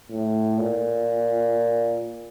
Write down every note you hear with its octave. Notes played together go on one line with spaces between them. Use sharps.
A2
A#2